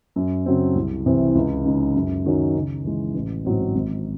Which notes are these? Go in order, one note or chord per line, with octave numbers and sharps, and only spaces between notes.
F#2
C#3 F#3 C4
C2
C3 E3 C4
C#2
C#3 G#3 D#4
F#2
D#3 F#3 C#4
C#3
E3 G#3
A1
G#2 F#3 C4
G#1